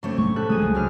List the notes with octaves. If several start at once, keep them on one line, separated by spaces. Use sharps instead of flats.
C#3 A3 C4 D4 C#5
A2 C#6
C3 A4 F#6
E1 F3 G#4 D#6
C#2
F#2 D4 F6